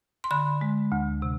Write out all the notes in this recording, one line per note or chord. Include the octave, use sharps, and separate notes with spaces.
C6
D3 B5
G#3
D2
C3